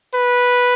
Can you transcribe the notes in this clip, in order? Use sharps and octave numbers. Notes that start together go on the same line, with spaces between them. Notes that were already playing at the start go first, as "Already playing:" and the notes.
B4